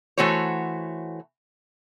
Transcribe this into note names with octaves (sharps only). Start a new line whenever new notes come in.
E3 A3 F#4 C5 C#5